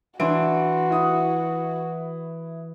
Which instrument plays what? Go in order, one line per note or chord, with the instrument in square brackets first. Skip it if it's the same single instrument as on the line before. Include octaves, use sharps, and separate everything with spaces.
[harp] E3 [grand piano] D4 C6 D7 [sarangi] F#4
[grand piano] E4 D#6